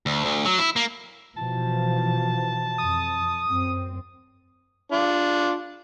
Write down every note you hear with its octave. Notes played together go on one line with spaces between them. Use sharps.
D2
D2
F#3
E4
A#3
B2 E3 F3 A5
F2 D#6
F#2 C4
D4 F4